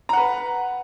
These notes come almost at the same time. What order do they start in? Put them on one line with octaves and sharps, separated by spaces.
A#5 F#5 B4